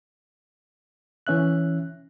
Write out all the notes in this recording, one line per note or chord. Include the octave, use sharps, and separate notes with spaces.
E3 C#4 E5 F#6